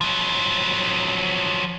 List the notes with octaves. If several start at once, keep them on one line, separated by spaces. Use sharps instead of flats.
F3 F#3